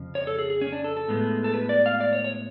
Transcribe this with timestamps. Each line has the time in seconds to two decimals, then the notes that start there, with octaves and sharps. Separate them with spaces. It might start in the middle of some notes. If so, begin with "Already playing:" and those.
Already playing: F2 C#3 F3
0.15 C#5
0.27 A4
0.39 G#4
0.50 G#4
0.61 C#4
0.73 D4
0.84 A4
0.97 A4
1.08 A2 G#3 B3
1.44 A4
1.54 B4
1.69 D5
1.86 F5
2.00 D5
2.13 C#5
2.24 C#5